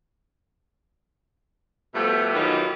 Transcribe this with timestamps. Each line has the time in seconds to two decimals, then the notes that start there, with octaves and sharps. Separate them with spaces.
1.95 B2 F3 G3 A3
2.34 D#3 E3 F#3 G#3 F4 G4